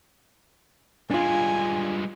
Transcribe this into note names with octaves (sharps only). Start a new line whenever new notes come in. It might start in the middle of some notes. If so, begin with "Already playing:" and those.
G2 G#3 D4 F4 G#5